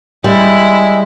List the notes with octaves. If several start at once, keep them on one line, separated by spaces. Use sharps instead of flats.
G3 G#3 E4